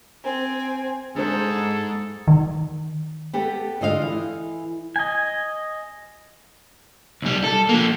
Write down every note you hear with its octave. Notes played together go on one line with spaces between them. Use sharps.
C4 G#5
G#2 D4 G#4 A4 C5
D#3
B3 G4 A4
D3 F4 D#5 F5
E3
D#5 G#5
B1 G3
A4
F3 A#3